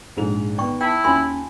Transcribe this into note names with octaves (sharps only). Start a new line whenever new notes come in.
A#1 G#2 F7
D#3 B3 D5 G5 C#6
E4 G5 A5
D#2 C#4 F4 G#5 C6